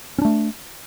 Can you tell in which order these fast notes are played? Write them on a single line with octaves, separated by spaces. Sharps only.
C#4 D4 A3